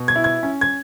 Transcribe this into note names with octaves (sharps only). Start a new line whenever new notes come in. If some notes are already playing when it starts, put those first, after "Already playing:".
Already playing: B2
G#6
E4
G#6
C#4
G#6